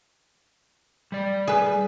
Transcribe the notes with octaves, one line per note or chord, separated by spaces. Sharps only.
G3 D5
G#4 B4